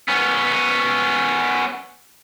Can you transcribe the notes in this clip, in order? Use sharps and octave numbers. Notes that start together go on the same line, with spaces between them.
B3 C#4